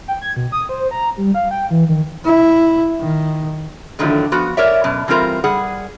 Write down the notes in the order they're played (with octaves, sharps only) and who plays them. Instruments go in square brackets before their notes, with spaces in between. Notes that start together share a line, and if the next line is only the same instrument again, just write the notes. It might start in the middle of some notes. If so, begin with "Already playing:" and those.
[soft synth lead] G5
G#6
B2
D#6
C5
A#5
G3
F5
G5
E3
D#3
[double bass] E4
D#3
[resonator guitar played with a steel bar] A2 D3 D#3 F3 F#3 A3
F3 B3 F#4
A#4 C#5 D5 E5
F#2 B2 A5
E3 G3 C4 F4 A#4
G3 G#4 F#5